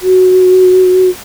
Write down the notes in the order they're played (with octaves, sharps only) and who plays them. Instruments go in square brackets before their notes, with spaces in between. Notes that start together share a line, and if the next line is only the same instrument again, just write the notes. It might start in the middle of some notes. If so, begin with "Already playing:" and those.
[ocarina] F#4